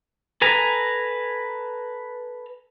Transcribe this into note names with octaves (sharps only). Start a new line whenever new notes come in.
A4 B4 G#5 A#5